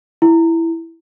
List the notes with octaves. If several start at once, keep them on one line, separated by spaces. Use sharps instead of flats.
E4